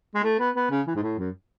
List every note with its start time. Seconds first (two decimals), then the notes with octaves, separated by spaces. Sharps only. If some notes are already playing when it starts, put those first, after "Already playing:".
0.15 G#3
0.23 A3
0.39 B3
0.55 B3
0.70 C#3
0.87 E3
0.96 G#2
1.02 A2
1.18 F#2